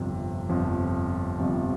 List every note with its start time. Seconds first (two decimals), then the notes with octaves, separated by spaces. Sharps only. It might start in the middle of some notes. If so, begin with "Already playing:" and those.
Already playing: G1 F2 C3 F3
0.49 G1 F2 C3 F3
1.38 G1 F2 C3 F3